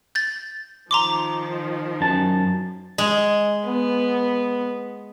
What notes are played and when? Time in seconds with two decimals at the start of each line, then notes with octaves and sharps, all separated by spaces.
0.15 G6 A6
0.91 D#3 F3 A#5 C6 D6
2.01 F#2 A5
2.98 G#3
3.66 B3